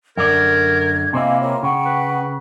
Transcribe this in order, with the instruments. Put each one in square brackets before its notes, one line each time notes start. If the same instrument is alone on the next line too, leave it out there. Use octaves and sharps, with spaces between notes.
[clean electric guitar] F#2 D3 D5 [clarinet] A#4 [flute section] G#6
[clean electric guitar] C3 C4 E4 [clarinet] A#3 [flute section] D#5 F5 G#5
[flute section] F4 A#4 C#5
[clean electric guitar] C#3 [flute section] F#5 G5
[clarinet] B4